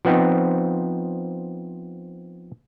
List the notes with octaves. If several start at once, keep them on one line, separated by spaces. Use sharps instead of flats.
F3 B3 C4 D#4